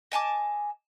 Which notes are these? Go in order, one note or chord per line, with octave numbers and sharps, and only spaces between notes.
D#5 G#5 A5 D6